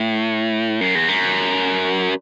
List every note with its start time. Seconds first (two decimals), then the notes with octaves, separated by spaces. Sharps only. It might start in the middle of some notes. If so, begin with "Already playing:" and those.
Already playing: A2
0.81 F#2
0.95 E2
1.09 F#2